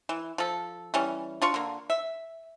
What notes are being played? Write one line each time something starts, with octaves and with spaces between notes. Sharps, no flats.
E3
F3 A4
E3 G3 C#4
D4 F4 C#6
D3 A#3
E5